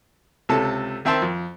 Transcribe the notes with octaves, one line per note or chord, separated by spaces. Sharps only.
C#2 C3 A4 A5
D#3 C4 E5 G5 A5 C6
F2